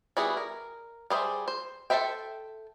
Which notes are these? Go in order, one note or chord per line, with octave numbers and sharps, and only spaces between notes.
G3 B3 E4 F#4 G#4
A#4
G3 G#4 C5 E5
C5
A4 B4 C5 E5 G5